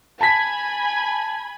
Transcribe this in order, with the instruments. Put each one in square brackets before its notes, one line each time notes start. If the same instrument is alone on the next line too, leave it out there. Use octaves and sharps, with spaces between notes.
[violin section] G#5 B5 G#6 [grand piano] A5 B6